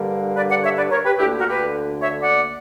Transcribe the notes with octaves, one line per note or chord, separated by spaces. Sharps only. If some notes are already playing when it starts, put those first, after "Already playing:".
Already playing: G2 D3 G3 A#3
B4 D5
D5 F#5
C#5 E5
B4 D5
A#4 C#5
G4 B4
D2 D3 A#3 E4 G4
F#4 A#4
G4 B4
C#5 E5
D5 F#5